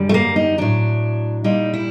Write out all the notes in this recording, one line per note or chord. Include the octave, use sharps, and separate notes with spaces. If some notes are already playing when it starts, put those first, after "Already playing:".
Already playing: F#2 D3 G3
A3
A#3
D#4
A2 F#3 D4
A#2 G3 D#4
E4